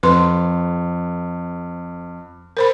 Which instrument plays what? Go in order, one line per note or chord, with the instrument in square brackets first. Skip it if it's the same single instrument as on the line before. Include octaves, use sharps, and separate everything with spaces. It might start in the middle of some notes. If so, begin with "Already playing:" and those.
[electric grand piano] F2 [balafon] B4 C6
[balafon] A#4 C5 B5